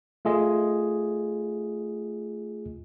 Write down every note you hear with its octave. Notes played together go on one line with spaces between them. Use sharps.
A3 F4 G#4 D#5